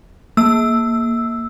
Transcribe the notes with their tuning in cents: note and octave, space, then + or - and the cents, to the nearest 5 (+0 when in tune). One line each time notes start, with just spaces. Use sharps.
A#3 +0 E6 +0